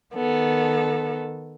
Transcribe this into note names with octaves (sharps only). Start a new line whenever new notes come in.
D#3 B3 A4